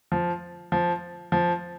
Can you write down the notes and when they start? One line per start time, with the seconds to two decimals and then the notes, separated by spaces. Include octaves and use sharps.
0.12 F3
0.72 F3
1.32 F3